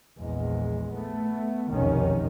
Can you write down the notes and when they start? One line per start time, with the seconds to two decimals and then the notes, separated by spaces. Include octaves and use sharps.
0.19 A#1 E2 G#3
0.93 A3 B3
1.71 F1 B1 E2 A2 D#3 C#4